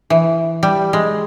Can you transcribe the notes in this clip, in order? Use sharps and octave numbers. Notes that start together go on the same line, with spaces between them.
E3
G3
G#3